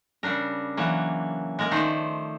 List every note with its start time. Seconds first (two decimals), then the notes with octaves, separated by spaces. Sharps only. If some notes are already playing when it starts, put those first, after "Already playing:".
0.23 C#3 G3 D4 A#4
0.77 E3 F#3 A#3
1.59 G#3 A#3 A#4
1.71 D#3 F3 A3 C5 D5